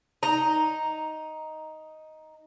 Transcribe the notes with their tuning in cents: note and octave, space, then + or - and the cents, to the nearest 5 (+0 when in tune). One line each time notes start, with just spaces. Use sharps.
D#4 +5 A#5 +0